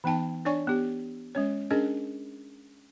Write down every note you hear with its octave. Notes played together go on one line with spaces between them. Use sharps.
E3 B3 D#4 G5 A5
D4 C#5 D5 G#5 C#6
B3 G4
G#3 C#4 C#5
C#4 D4 G#4 A#4 D#5